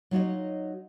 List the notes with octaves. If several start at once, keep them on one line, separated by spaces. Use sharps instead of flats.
F#3 D#4 F4 F#4 C#5 D#5